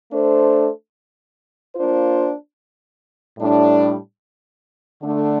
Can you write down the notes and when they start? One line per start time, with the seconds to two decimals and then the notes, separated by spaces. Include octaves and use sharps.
0.11 A3 D4 A4 C5
1.74 A#3 D4 F4 C5
3.38 A2 G3 D4
5.02 D3 A3 D4